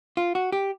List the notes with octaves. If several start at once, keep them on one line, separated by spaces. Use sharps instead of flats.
F4
F#4
G4